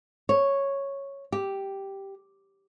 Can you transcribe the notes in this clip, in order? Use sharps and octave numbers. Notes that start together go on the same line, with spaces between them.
C#5
G4